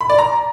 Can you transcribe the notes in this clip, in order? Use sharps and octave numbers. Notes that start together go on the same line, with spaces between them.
B5
D5
A#5